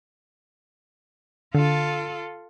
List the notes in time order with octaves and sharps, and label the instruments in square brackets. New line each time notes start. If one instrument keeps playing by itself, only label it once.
[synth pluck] D3 [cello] F4 A4